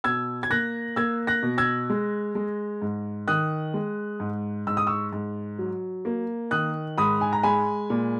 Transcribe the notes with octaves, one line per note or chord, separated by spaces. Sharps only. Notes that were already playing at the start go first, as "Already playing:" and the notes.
B2 E6 G#6
G#6
A#3 F#6 A#6
A#3 E6 G#6
F#6 A#6
B2
E6 G#6
G#3
G#3
G#2
D#3 D#6 F#6
G#3
G#2
G#2 E6
D#6
C#6 E6
G#2
F#3
A#3
D#3 D#6 F#6
G#2 B5 D#6
G#5
A#5
G#3 G#5 B5
A#2